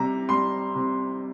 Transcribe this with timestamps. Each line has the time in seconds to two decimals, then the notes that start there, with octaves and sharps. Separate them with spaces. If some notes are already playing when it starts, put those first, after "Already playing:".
Already playing: C3 G3 A#5
0.29 G3 C6
0.75 C3